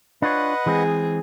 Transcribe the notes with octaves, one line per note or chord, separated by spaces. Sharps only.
D4 F4 B4 C#5 D#5 F#5
E3 G#3 C4 G#4